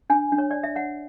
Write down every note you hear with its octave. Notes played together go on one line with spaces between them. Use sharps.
D4 G#5
D4
C#5
C#5 D5
E5
C#5 F#5